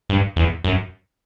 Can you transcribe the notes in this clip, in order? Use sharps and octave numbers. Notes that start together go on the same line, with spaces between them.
G2
E2
F#2